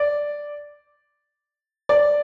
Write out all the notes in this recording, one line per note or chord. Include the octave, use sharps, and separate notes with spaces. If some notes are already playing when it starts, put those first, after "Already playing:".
Already playing: D5
D5